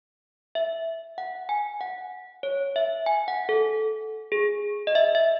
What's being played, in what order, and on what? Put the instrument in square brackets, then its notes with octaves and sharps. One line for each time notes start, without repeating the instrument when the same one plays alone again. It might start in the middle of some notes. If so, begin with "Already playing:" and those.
[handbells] E5
F#5
G#5
F#5
C#5
E5
G#5
F#5
A4
G#4
D#5
E5
E5